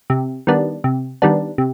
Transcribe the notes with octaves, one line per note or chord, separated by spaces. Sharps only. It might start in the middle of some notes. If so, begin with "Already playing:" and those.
C3
D#3 G3 B3 D4
C3
D#3 G3 B3 D4
C3